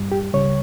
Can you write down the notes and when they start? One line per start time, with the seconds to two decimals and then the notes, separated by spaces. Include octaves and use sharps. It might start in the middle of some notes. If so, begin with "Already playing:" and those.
Already playing: G2 G3
0.12 G4
0.33 C#2 C#3 G3 C#5